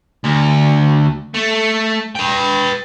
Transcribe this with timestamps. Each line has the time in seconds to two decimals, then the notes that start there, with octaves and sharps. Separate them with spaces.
0.24 D2
1.34 A3
2.16 B4 G5